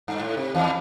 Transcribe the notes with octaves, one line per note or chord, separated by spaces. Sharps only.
G2
A2
C3
E2 E3